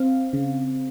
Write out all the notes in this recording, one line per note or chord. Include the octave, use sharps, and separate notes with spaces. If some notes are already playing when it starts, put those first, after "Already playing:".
Already playing: C4 F5
C#3